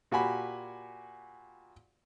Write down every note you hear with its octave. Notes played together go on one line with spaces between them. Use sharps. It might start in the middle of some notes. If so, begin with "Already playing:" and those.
A#2 F#4 G4 G#5 B5